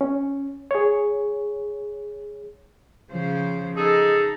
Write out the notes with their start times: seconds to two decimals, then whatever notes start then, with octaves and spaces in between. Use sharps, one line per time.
0.01 C#4
0.71 G#4 C#5
3.11 C#3 F3 C5
3.76 D#4 G#4 A4